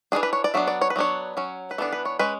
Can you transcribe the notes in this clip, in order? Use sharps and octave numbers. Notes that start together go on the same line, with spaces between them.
E3 G#3 D4 G#4
B4
C#5
D5
F#3 B3 D4 E5
D5
C#5
B4
F#3 B3 D4 C#5
F#3 C#4
B4
E3 B3 D4 A4
B4
C#5
G#3 C#4 B4